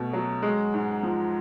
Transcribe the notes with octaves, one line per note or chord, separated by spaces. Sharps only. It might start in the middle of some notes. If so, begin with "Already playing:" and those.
Already playing: B2 A3
F#3
G#3
G#2
F3